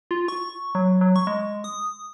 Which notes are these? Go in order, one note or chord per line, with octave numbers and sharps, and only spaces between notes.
F4
C#6
F#3
F#3
C#6
G#3
D#6